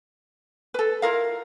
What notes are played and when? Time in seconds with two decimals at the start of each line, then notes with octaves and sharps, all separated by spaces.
0.74 A4 B4
1.02 E4 F4 A#4 F5